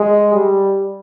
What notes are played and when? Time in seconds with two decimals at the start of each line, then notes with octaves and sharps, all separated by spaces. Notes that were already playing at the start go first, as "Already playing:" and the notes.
Already playing: G#3
0.34 G3